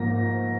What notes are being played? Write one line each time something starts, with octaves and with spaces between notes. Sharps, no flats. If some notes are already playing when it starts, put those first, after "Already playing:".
Already playing: G#2 F3 A#3 A#6